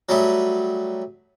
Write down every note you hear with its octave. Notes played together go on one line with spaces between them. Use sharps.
F#3 G3 A3 D#6